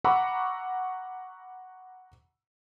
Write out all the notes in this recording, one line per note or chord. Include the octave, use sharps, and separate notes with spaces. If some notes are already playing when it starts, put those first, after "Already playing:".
F#5 A#5 B5 C#6 D6 E6